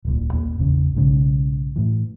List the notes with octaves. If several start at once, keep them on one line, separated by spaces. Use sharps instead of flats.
D1 C2 A#2
D#2 A#2 A#3
G#1 E2 C#3
B1 G#2 C#3
A2 E3